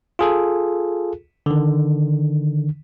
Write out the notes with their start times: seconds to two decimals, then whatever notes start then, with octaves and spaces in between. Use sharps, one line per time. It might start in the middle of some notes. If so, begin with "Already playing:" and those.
0.19 F4 G#4 A4
1.46 D3 D#3